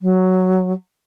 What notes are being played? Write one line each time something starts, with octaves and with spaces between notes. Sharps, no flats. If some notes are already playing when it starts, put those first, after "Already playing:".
F#3